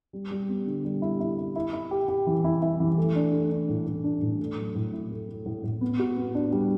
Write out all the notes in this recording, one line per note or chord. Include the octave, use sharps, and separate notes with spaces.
G3
G3
B3
D3
G3
E4
E4
E4
E4
E4
G4
G4
E3
E4
E4
E3
A3
D4
A3
D4
A2
A2
D4
A2
A3
F#3
A2
E4
A3
A3
A2
A2
B3
F#4
B3
D4
G3